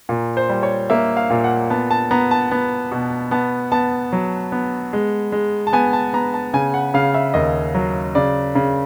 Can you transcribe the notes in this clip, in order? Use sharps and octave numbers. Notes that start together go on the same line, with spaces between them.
A#2
C5
G3
C#5
A#3 E5
F5
A#2
F#5
B3 A5
A5
B3 A#5
A5
B3
B2
B3 A5
B3 A5
F#3
B3
G#3
G#3
A5
B3 G#5
A5
B3 A#5
A5
C#3 G#5
F#5
C#3 F5
E5
D#2 D#5
F#3
C#3 D5
C#3